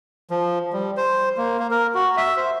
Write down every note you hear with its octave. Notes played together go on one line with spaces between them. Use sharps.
F3
G3
C5
A#3
A#3
A#4
F#4
E5
C5